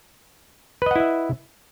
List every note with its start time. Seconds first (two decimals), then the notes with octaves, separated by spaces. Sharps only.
0.82 B4
0.86 D#5
0.91 F#5
0.96 E4
1.00 E5